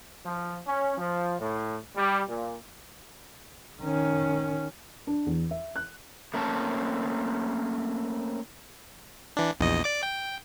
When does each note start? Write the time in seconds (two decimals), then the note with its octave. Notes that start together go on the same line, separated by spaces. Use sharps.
0.25 F3
0.67 C#4
0.97 F3
1.39 A2
1.95 G3
2.28 A#2
3.81 D#3 C#4
5.07 D4
5.26 E2
5.51 E5
5.76 F#6
6.34 A3 A#3 C4 C#4 A5
9.37 E3 D4
9.60 A#1 E2 D#5
9.84 D5 D6
10.03 G5